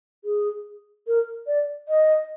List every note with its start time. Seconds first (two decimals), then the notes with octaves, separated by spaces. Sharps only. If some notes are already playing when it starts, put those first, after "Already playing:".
0.25 G#4
1.07 A#4
1.47 D5
1.89 D#5